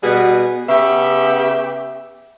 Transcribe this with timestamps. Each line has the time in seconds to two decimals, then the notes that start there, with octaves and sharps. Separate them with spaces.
0.03 B2 G3 B3 F#4 G#4
0.69 C#3 B3 G4 E5